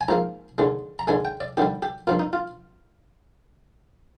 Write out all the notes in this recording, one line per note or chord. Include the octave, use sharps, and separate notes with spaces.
G#5
G#2 F3 A#3 A#5
D#2 D3 G#3
A#5
D#2 D3 G#3 G#5
G5
D5
D#2 D3 G3 G4
G4
G2 F3 A#3 F4
D#4
F4